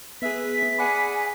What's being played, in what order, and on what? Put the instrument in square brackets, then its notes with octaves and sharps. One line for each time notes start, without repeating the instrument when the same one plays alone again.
[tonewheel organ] B3 [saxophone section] G#4 B4 E5 [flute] B6
[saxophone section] G#4 D5 F#5 [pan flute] G#5 [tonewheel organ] B5